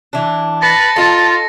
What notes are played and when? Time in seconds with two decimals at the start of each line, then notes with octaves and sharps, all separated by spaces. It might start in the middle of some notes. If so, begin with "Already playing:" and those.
0.13 E3 D4
0.62 B4 A5 A6 A#6 C#7
0.96 D#4 F4 A4